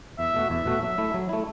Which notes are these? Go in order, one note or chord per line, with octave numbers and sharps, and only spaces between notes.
E2 E5
B2 A3 F#4
E2 E5
B2 A3 F#4
F#3 E5
A3 E4
F#3
A3 E4